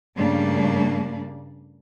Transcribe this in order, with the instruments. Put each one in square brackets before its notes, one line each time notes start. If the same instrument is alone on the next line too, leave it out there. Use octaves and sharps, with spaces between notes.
[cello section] G2 C#3 G3 A3 A#3 D4